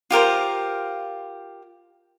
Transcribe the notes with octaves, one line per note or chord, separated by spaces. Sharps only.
F4 G4 A#4 C5